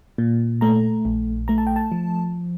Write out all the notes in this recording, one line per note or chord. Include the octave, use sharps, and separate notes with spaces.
A#2
A3 A#5
A#1
A3 A#5
A5
G5
A5
F3